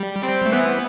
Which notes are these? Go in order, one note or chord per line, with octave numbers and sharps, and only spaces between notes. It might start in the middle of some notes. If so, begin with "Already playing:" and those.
Already playing: G3
C4
A3
E3 B3